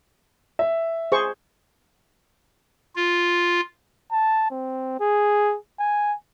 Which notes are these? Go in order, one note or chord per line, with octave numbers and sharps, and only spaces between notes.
E5
G#4 C5 C#6
F4
A5
C4
G#4
G#5